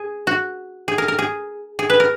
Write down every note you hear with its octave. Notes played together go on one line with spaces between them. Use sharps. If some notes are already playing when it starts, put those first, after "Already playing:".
Already playing: G#4
F#4
G#4
A#4
A#4
G#4
G#4
B4
A#4